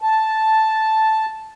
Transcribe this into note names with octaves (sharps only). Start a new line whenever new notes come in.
A5